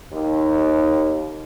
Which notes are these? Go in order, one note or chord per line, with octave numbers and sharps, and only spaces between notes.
D#2